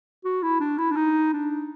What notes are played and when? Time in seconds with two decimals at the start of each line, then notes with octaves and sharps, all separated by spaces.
0.25 F#4
0.43 E4
0.60 D4
0.78 E4
0.91 D4
0.96 D#4
1.33 D4